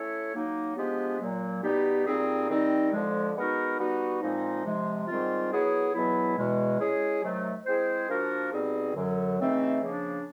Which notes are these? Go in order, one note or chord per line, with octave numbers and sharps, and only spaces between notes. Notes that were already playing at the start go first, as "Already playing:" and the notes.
Already playing: A3 C#4 E4 A4 C#5
F#3 A#3 D#4
F3 G#3 B3 D4 G4
A#2 F#3 A#3
B2 G3 B3 D#4 G4
A#2 G3 C4 D#4 G#4
D#3 G3 C4 D#4
F2 D3 F3 G#3
G#3 B3 D#4 F#4 A#4
G3 B3 D#4 F#4
A#2 F3 G#3 C4 D#4
C3 F3 G#3
G#2 D#3 G3 C4 F4
F#3 B3 E4 G#4 C#5
E2 B2 F#3 B3 E4
E2 B2 G#3
G#3 C#4 E4 G#4
C3 D#3 F#3 A3
G#3 C4 E4 G#4 C5
F3 A#3 D4 F#4 A#4
B2 G3 C4 D#4 G#4
F#2 D3 F#3
C#3 E3 A3 C4 D#4
C#3 F3 A#3 D4